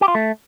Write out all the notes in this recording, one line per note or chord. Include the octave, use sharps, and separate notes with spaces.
G4
F4
A3